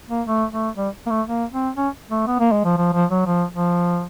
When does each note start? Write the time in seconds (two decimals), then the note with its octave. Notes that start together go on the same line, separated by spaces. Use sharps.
0.11 A#3
0.27 A3
0.52 A3
0.77 G3
1.06 A#3
1.10 A3
1.27 A#3
1.52 C4
1.77 C#4
2.11 A3
2.27 B3
2.40 A#3
2.52 G#3
2.65 F3
2.77 F3
2.94 F3
3.10 F#3
3.27 F3
3.53 F3